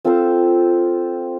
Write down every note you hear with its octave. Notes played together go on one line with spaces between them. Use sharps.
C4 F4 A4 C5